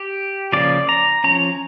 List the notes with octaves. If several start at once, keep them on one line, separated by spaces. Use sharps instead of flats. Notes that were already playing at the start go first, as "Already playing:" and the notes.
Already playing: G4
C#3 F3 A#3 C#4 D5
A#5
F3 C#4 A#5